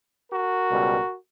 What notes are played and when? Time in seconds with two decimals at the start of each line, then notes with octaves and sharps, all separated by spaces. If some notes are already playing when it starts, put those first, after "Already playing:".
0.30 F#4 A#4
0.70 C#2 B2 G3